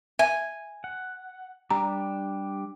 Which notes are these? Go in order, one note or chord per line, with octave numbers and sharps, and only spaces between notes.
E5 G#5
F#5
G3 D4 G4 A#5